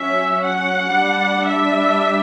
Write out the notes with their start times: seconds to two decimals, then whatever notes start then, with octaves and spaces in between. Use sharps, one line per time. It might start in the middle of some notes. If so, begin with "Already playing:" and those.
Already playing: F#3 C#4 E5
0.44 F#5
0.95 G3 D4
1.46 E5